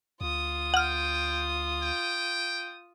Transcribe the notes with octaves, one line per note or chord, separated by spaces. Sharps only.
D2 F4 D#6
F#5 G5 F6
G5